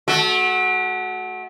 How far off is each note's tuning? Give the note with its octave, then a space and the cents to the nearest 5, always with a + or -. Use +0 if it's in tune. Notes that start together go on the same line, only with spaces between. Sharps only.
A3 -30 F#4 +0